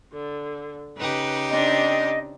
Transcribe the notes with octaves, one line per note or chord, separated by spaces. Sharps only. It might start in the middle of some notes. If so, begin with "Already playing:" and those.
D3
C#3 D#4 G4 B4
C4 D4 D#5